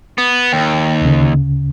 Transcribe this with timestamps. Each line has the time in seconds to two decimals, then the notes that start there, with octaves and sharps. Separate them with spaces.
0.18 B3
0.53 D#2 G5
1.01 D2 C#3